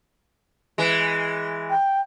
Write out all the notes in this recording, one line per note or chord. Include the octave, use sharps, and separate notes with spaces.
E3 G#3
G5